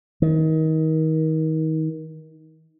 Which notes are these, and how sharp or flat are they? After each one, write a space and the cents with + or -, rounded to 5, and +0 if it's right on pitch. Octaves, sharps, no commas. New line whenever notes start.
D#3 +30